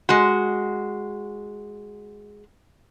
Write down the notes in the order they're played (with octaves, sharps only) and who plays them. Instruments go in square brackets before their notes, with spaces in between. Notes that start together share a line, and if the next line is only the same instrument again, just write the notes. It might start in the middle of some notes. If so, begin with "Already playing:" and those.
[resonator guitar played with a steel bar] G#3 F#4